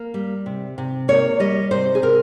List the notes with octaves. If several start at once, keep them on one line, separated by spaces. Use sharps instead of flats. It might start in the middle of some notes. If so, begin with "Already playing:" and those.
Already playing: A#3
G3
C3
C3
A#3 C#5
G3 D#5
C3 C5
G#4
C3 A#4